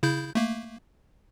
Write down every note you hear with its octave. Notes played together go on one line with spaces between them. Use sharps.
C#3 E4 G6
A3 A#3